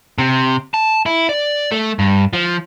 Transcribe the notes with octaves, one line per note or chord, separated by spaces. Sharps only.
C3
A5
E4
D5
A3
G2
F3